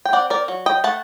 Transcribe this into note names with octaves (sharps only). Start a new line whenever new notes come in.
G5
C4 D5 F#5
A#4 D5
F#3
D#5 G5
A3 F#5 A5